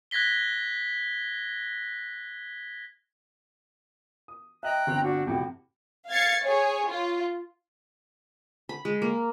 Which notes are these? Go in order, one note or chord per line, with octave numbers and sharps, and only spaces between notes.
F#6 G#6 A#6 B6 G7
D#6
D#5 E5 G5 A#5 F#6
G1 C4
D4 F#4
F2 A2 C3 F#4 G4
F5 G#6 A6 C7 C#7
G#4 C#5
F4
B5
G#3
A#3